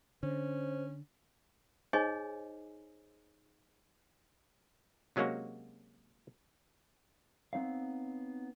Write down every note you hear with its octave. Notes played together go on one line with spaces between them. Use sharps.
D3 C#4 C5
D#4 G#4 C5 C#5 D#5 G#5
C3 F#3 G#3 A#3 C#4 F#4
B3 C4 D#4 C#5 F5